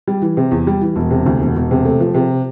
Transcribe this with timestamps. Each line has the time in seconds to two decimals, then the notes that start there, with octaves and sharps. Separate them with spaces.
0.07 G3
0.22 E3
0.37 C3
0.51 E2
0.67 G3
0.82 E3
0.96 E1
1.11 C3
1.26 D2
1.41 E1
1.56 E1
1.71 C3
1.85 A3
2.00 F3
2.15 C3